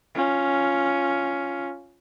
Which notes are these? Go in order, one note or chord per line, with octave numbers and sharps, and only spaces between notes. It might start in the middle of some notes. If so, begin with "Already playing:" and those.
C#4 F4